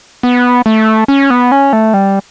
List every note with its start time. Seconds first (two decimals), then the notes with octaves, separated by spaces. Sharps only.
0.23 B3
0.66 A3
1.08 C#4
1.30 B3
1.52 C#4
1.73 A3
1.94 G3